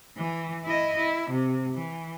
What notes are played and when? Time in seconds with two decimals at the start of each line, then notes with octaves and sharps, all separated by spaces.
0.17 E3
0.65 E4 D#5
0.98 E4
1.31 C3
1.74 E3